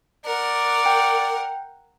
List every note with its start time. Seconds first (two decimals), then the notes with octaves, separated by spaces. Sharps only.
0.26 A#4 D5 F#5
0.86 G5